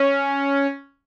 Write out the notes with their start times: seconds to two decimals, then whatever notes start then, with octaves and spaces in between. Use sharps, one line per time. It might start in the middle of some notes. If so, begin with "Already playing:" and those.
Already playing: C#4